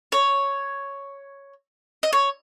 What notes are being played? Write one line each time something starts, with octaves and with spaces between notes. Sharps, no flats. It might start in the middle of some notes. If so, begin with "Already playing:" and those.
C#5
D#5
C#5